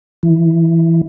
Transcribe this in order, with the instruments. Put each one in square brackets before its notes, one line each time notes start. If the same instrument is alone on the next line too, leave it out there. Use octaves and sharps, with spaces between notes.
[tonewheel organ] E3